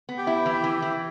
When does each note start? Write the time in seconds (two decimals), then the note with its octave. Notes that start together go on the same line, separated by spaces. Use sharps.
0.09 B3
0.17 G4 G5
0.27 E4
0.46 E3
0.64 E3
0.82 E3